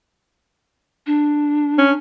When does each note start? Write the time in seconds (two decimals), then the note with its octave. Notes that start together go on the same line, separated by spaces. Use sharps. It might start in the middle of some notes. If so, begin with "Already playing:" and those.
1.06 D4
1.78 C#4